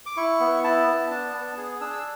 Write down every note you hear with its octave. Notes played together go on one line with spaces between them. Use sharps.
D6
E4 C#6
B3
E4 A5
B3
D4 A5
B3 A5
G#4
D4 E6
E6